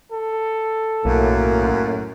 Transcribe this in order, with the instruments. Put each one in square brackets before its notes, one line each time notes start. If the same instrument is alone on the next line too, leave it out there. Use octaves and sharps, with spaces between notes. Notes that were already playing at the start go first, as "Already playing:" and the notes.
[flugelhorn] A4
[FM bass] B1 [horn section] F#2 A2 [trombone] A#3